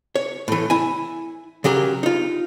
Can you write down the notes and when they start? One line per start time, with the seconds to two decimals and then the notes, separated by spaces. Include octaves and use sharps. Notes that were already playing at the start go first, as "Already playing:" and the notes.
0.16 C#5
0.48 A2 E3
0.70 E4 G#5
1.64 C#3 F#3 G4 G#4 A#4
2.03 D#4 F4